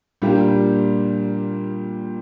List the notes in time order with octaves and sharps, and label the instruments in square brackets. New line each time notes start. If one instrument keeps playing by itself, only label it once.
[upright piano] A#2 G3 A#3 D4 G4